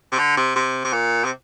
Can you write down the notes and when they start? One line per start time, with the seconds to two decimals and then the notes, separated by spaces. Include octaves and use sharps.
0.12 C3
0.19 D3
0.37 C3
0.56 C3
0.84 C3
0.93 A#2
1.24 C3